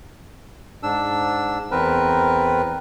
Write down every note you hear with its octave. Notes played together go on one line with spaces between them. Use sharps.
G#2 D4 E6
E2 C4 A#4 B4